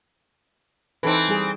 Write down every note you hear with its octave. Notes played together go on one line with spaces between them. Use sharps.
E3 C4 D#4 A4 B4
G3 G#4